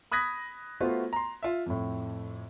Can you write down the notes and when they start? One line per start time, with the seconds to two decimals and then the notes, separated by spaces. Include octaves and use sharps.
0.11 B5 D#6 F#6 G#6 A#6 B6
0.81 A3 B3 F4 F#4 C5
1.13 A#5 C6
1.43 F4 E5
1.66 F2 A2